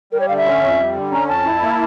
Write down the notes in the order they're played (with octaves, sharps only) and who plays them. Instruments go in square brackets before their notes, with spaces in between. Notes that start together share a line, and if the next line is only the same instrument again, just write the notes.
[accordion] G3 [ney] A#4
[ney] C#5
[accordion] D3 [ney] F5
[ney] E5
[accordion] C#4
F2
G3
D3
[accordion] C#4 [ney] A#5
[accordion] F2 [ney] A5
[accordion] E4
A#3